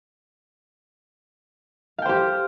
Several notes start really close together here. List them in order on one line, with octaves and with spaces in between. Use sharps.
F5 G5 C5 G4